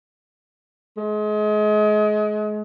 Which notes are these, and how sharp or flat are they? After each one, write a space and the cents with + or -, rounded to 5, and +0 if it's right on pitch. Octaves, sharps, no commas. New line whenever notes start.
G#3 +30